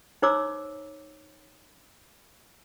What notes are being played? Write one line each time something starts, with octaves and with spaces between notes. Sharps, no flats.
D#4 C5 C#5 A#5 D6 E6